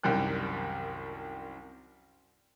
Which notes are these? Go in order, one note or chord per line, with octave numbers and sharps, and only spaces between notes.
C2 F#2 D#3 G3 G5 F#6